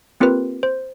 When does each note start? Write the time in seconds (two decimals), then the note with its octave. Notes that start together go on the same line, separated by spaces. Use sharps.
0.20 A#3 C4 F4 G4 A#4 B4
0.63 C5